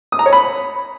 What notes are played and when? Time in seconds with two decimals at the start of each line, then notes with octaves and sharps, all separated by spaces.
0.12 D#6
0.19 A#5
0.26 C#5
0.33 B5